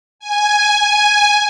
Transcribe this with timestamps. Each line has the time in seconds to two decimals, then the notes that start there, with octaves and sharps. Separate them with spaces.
0.19 G#5
0.78 G#5